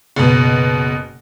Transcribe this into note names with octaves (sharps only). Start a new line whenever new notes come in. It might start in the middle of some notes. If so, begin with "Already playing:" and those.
F#1 B2